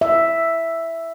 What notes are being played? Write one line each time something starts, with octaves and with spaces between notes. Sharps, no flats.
E5